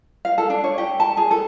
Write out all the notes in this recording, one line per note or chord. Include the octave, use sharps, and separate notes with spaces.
F5
A4
D4
C#5
G4
A5
G#4
A4